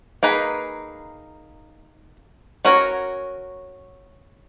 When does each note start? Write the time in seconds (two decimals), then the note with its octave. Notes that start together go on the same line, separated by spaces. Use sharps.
0.23 A#3 D#4 G#4 B4
2.65 C#4 F#4 A#4 C#5